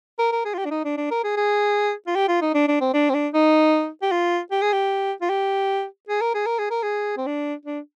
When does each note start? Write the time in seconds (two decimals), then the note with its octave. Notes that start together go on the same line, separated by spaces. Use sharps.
0.19 A#4
0.32 A#4
0.45 G#4
0.54 F4
0.58 G4
0.65 D4
0.71 D#4
0.84 D4
0.97 D4
1.11 A#4
1.24 G#4
1.37 G#4
2.07 F4
2.15 G4
2.28 F4
2.42 D#4
2.55 D4
2.68 D4
2.81 C4
2.94 D4
3.10 C4
3.14 D4
3.34 D#4
4.02 G4
4.12 F4
4.51 G4
4.62 G#4
4.73 G4
5.22 F4
5.30 G4
6.09 G#4
6.21 A#4
6.34 G#4
6.46 A#4
6.59 G#4
6.70 A#4
6.83 G#4
7.18 C4
7.27 D4
7.66 D4